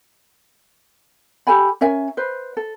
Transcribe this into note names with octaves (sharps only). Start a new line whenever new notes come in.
G4 A4 G#5 B5
C#4 A#4 E5 G#5
B4 C5
A4